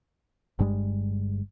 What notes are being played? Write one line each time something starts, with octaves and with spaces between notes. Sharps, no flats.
G1 G2 G3 G#3